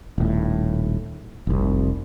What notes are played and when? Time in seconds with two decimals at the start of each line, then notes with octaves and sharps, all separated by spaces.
0.18 D#1 A2
1.47 F1 C2